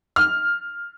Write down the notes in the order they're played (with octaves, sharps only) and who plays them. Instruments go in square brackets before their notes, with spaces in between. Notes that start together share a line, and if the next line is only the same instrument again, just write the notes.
[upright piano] F6